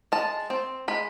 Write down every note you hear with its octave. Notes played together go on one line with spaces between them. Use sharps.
G#3 A5
C4
G#3 B5